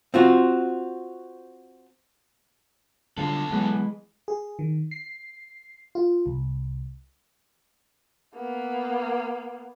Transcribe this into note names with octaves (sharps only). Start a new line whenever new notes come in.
C4 F4 F#4
B1 D3 G3 F4 A4
E3 F#3 G#3 B3
G#4
D#3
C7
F4
C2
A#3 B3